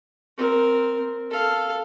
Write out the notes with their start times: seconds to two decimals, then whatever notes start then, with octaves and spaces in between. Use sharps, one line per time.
0.37 C4 A#4
1.30 A4 F5